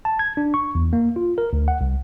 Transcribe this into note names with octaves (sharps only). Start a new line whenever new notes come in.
A5
G#6
D4
C#6
E2
A#3
F4
A#4
D2
F#5
C2